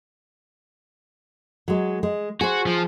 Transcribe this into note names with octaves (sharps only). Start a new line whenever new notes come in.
F#3 G#3
G#3
F#4 G#4 C5
F3